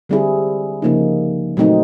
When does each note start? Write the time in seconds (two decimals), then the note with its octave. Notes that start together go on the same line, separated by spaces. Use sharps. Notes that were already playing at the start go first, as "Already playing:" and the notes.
0.09 D3 G3 C4 E4 G#4
0.82 C#3 F3 A#3 D#4
1.57 A#2 F#3 A3 C4 D#4